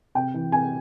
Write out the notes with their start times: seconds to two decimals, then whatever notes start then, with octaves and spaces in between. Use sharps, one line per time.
0.15 C3 G5
0.34 E3
0.52 C3 G#5